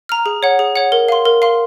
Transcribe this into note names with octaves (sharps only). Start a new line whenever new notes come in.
A#5 F6
G#4
C#5 F#5
G#4
C#5 F#5
A#4
F5 C6
A#4
F5 C6